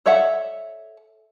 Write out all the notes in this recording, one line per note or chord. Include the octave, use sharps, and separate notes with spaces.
A4 C#5 D5 E5 F#5